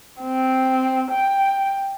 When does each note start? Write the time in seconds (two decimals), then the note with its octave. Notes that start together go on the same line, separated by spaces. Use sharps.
0.22 C4
1.11 G5